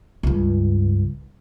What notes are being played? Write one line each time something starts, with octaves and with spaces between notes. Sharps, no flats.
C#2 G2